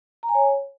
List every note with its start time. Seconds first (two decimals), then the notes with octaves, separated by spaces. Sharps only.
0.23 A#5
0.29 G#5
0.35 C#5